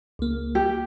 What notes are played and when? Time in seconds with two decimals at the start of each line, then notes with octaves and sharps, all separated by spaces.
0.19 C#2 A#3
0.55 G4